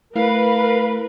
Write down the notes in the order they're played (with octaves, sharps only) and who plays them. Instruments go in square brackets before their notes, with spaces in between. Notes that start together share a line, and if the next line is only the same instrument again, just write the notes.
[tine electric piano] A3 E4 [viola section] A#4 B4 [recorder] F5